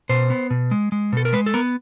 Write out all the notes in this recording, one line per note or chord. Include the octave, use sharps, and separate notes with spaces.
B2 C5
B3
B2
G#3
G#3
B2 A4
A#4
G#3 B4
A4
B3 A#4